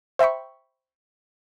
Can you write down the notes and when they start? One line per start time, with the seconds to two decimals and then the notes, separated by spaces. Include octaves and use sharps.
0.19 C5 E5 G5 B5 C#6